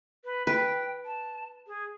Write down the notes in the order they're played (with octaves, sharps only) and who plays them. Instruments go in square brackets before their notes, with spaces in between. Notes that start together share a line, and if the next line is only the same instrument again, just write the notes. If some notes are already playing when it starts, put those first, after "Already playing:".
[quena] B4
[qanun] B4 [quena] G5
[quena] A5
G#4